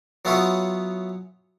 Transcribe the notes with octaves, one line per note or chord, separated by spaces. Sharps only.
F#3 B3 E4 F4 G#4 C#5